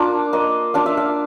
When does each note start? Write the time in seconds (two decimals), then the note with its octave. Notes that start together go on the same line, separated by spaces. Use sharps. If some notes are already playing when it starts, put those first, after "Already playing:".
Already playing: A#3 D4 F4
0.33 A#3 D#5
0.74 D4 F4 F5
0.86 E5
0.97 F5